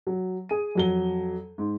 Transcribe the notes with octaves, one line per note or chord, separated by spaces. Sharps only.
F#3
G#4 D#7
F2 F#3 G7
G#2